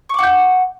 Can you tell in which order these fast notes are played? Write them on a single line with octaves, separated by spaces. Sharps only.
C#6 D6 F#5 G6